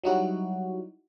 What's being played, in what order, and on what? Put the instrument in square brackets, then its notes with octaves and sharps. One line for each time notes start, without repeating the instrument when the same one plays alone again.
[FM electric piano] F#3 G3 D#4 E4 F#4